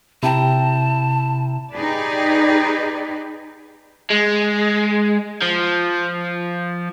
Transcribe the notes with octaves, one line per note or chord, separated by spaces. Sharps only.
C3 E4 G5 A5 A#5
D#4 G4 G#4 B4 D5
G#3
F3